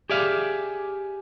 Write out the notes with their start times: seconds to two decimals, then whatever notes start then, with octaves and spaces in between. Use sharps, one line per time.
0.10 G4 G#4 D5 E5 F5